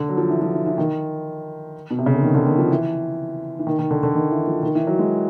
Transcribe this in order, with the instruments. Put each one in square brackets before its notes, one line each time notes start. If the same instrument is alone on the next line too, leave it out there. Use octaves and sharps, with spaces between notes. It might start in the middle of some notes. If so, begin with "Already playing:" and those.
Already playing: [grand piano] D3
F#3
F3
E3
F3
E3
E3
D#3
B2
C3
C#3
D3
D#3
D3
D#3
F3
E3
E3
D#3
D#3
D3
D3
D#3
E3
F3
D#3
E3
F#3
G#3